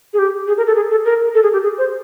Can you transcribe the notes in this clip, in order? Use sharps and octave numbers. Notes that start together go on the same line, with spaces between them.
G#4
G4
G#4
A#4
A4
G#4
A4
A#4
A4
G#4
G4
G#4
C5